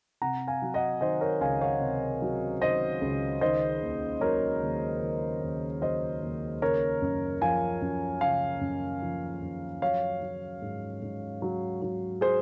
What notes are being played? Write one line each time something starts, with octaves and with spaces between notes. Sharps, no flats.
C3 F#5 A#5
F5 G#5
F#3
D#5 F#5
D#3 C5 D#5
A#4 C#5
C#2 F5 G#5
C#5 F5
C3
F#3
D#3 C5 D#5
C#2
D#3 C5 D#5
D#2
F#3 A#4 C#5
D#2
D#3
D#2
F#3 C5 D#5
D#2
C#3 A#4 C#5
F#2
F3 F5 G#5
F#2
C#3 F5 G#5
F#2
F3
F#2
F#3 C#5 F5
F#3
G#2
G#2
F#3
F#3
G#4 C5